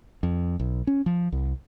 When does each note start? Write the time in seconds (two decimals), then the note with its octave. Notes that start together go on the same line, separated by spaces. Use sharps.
0.23 F2
0.60 B1
0.87 C#4
1.06 F3
1.32 C2